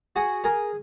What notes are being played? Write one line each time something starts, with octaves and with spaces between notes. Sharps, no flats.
F#4 G#4
G#4 A#4